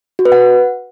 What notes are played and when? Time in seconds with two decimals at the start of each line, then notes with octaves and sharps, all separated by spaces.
0.19 F#4
0.25 B4
0.32 F#5